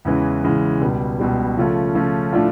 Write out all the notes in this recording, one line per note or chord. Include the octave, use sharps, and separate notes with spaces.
E2 C#3 E3 G#3 C#4
E2 C#3 E3 G#3 C#4
C#2 B2 G3
C#2 B2 G3
C#3 F3 A3 C#4 F4
C#3 F3 A3 C#4 F4
A2 F3 A3 D4 F4